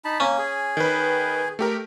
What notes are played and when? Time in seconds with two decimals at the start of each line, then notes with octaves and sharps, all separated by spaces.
0.05 D#4 A5 B5
0.20 A#3 C#4
0.39 G#4
0.77 D#3 B4
1.59 A3 G4 A#4